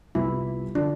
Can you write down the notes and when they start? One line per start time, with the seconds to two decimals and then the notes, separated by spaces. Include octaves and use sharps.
0.15 C2 C3 G3 B3 E4 F4
0.75 D3 F3 D4